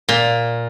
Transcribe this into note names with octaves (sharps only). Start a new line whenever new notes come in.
A#2